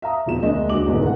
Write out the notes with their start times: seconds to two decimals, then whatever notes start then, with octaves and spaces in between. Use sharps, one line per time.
0.02 E5 F5 A#5 D#6
0.26 E1 B2 F3 E7
0.43 D2 G#3 A#3 D4 D#5
0.69 D#1 C#2 F#4 D6 F#7
0.86 C2 G#2 D3 D#3 G#3 B3
1.03 A#4 F#5